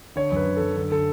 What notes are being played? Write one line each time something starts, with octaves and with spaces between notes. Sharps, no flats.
D3 C#5
F#2 B4
D3
F#2 A4
D3 A4
D3 A4